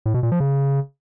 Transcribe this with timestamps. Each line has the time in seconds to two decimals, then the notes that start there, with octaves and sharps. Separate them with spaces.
0.06 A2
0.14 B2
0.23 A#2
0.32 F3
0.40 C#3